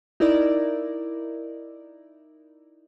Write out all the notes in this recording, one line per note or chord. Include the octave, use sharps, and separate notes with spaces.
D#4 E4 A#4 D5